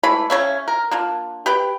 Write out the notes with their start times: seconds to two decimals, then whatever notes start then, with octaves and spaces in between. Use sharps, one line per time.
0.03 E3 G#3 A3 B5
0.30 C#3 A#3 C#4 E5
0.68 A#4
0.91 A#3 D4 F4
1.46 G4 B4 G5